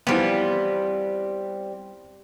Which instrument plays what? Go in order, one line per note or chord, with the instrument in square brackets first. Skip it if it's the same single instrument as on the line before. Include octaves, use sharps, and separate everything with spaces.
[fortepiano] E3 F3 B3 [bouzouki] G3 C4